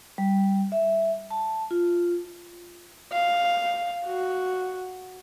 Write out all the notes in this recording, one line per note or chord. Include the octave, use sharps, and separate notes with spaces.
G3
E5
A5
F4
F5
F#4